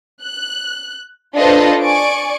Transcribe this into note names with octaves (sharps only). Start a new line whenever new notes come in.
F#6
D4 F4 A4 B4 C5 D#5
D5 G#5 C#6 D7